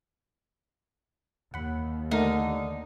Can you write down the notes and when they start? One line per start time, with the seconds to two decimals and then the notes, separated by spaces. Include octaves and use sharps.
1.54 D#2 F#5 B5
2.11 D3 A3 D#4 A#4